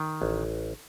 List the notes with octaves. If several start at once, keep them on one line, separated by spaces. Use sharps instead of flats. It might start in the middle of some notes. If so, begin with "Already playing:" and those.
Already playing: D#3
A1